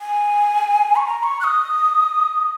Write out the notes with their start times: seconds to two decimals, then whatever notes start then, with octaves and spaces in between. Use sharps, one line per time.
0.01 G#5
0.96 C#6
1.06 A#5
1.23 C#6
1.41 F#6
1.44 D#6